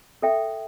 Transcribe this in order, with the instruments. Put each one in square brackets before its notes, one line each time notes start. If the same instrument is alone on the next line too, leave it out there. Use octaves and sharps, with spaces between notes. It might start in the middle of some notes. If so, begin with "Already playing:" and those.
[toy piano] A4 E5 G5